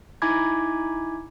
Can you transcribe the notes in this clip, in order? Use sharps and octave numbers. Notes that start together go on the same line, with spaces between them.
D#4 E4 G#5 B5 D6 G#6